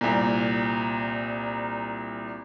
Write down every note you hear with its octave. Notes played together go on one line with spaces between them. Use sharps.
C2 A#2